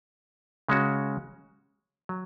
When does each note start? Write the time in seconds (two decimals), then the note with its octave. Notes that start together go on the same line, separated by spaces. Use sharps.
0.68 C#3 G#3 C#4 F#4
2.09 F#3